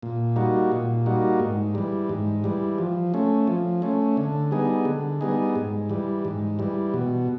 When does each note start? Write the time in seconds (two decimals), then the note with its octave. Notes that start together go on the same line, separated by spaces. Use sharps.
0.03 A#2
0.36 G3 A#3 D#4 F#4
0.72 A#2
1.06 G3 A#3 D#4 F#4
1.40 G#2
1.75 E3 G3
2.09 G#2
2.44 E3 G3
2.78 F3
3.14 A3 C#4
3.47 F3
3.82 A3 C#4
4.17 D3
4.51 G3 B3 D#4 G#4
4.85 D3
5.21 G3 B3 D#4 G#4
5.55 G#2
5.90 E3 G3
6.25 G#2
6.59 E3 G3
6.94 B2